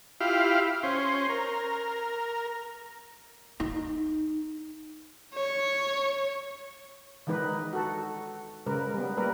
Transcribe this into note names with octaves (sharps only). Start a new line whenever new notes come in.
E4 F4 G4 F5
C#4 C5
A#4
D#4
C#5
D#3 E3 G#3 D#4 B4
F#4 A4
C#3 G#3 A#4 B4
G3 B3
G3 A#3 A#4 B4